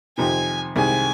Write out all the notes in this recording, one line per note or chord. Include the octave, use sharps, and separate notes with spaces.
F2 C3 D#3 G#5
C2 C3 D#3 G#3 G#5